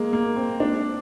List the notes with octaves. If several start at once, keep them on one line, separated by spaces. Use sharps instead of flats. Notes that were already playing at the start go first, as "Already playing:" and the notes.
Already playing: G#3 A#3
A#3
C4
D4